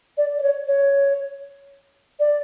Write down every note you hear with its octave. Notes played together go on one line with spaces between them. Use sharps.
D5
D5
C#5
C#5
D5